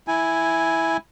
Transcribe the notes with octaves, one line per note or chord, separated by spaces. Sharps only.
E4 G#5